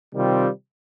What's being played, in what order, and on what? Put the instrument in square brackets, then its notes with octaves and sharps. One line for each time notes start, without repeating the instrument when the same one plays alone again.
[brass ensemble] C3 D#3 G3 C4 F4